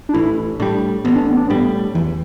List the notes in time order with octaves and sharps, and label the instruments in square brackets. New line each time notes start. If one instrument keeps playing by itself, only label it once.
[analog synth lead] D4
[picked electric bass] A1 [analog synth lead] E4
[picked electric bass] A2 G3 [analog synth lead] D4
[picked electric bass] A1 [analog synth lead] B3
[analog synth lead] D4
B3
D4
[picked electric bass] A2 G3 [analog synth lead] B3
[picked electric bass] E2 [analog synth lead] E3